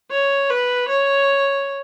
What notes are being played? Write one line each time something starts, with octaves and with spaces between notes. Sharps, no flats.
C#5
B4
C#5